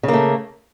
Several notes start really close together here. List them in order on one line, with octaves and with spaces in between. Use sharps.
C#3 A#3 A3